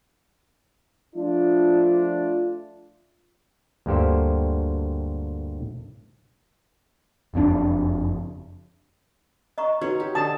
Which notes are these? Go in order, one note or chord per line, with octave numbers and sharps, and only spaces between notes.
F3 A3 D4 F4
D2 G2 A#3 G4 A4 C5
F#1 F2 B2 D4
D#5 A#5 C#6
D#4 F#4 B4 C#5 F#5
G4
D3 D#5 A5 D#6